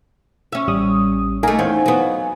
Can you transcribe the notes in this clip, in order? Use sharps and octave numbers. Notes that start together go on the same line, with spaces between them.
C#4 E5
A1 G3 D#6
A3 A#3 D#4 F5 G#5
E2 C4 C#4
F#3 B3